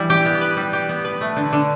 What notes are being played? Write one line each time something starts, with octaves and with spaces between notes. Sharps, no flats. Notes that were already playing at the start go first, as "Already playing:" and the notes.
Already playing: E3 G3 E4
G4
B3
B4
G3
G4
B3
B4
A3
D3
D3